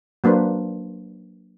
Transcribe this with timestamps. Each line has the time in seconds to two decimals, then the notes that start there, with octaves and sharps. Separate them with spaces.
0.24 F#3 A#3 D4 B4 C5